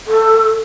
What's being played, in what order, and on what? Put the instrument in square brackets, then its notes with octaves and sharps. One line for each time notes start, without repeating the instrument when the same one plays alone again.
[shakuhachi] A4